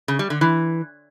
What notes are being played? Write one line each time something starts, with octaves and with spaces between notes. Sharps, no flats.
C#3
G3
D3
E3